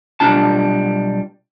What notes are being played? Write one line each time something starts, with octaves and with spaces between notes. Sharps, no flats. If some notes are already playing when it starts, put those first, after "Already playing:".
B1 G3 D4 F4 A5